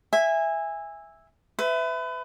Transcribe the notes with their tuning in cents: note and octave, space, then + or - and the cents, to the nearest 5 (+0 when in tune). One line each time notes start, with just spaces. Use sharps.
E5 +0 G#5 -20
B4 +30 E5 +0